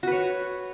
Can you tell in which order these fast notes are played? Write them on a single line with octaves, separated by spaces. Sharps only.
F#4 B4 C#5